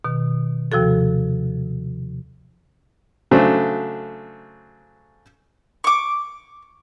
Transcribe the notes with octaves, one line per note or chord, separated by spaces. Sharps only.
B2 D#3
D#2 C3 F3 F#4 A4
C#3 F#3 A3 D4 F#4 C5
C#6 D6